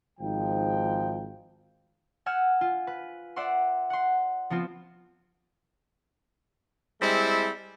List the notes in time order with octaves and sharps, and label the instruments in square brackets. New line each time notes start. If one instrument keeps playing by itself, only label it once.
[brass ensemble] G#1 G#2 F3 D#4 G5
[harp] F#5 G#5 E6 F6
F4
B4
D5 E5 F#5 C6
F#5 C6
F3 B3 C4 F4
[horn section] G3 G#3 C4 E4